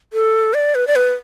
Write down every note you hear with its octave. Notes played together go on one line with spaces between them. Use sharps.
A4
D5
B4
D5
B4